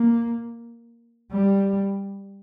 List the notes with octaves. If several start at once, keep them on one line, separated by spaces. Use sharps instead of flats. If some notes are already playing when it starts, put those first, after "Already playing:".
Already playing: A#3
G3